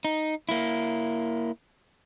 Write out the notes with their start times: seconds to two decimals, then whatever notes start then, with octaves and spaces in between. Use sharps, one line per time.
0.05 D#4
0.49 A#3 E4